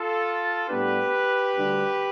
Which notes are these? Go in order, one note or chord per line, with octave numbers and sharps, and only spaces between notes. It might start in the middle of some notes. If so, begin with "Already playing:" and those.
Already playing: F4 A4
A2 G3 B3 D4 G4 B4
D2 D3 G3 D4